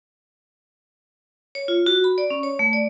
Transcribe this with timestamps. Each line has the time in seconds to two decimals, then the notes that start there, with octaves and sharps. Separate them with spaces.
1.55 C#5
1.68 F4
1.86 F#4
2.04 B5
2.18 D5
2.30 C#4
2.43 C#5
2.59 A3
2.73 D5